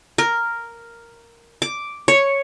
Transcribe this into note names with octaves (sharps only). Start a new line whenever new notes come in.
A#4
D6
C#5